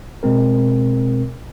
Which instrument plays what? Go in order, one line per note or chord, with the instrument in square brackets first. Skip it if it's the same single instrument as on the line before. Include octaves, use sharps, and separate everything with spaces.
[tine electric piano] B2 G#3 C4 A#4